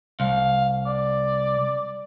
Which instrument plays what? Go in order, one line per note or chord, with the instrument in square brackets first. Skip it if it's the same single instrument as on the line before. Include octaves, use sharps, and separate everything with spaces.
[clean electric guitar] C2 [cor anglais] F5
[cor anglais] D5